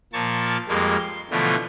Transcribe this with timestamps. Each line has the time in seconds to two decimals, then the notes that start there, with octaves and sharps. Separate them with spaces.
0.13 A#2 F3 A#3 A5 C#6
0.68 F2 G3 G#3 A#3
0.99 C6
1.31 B2 D3 E3 F3 A3